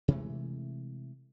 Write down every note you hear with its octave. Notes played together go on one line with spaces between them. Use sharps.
C3 E3 G#3 A3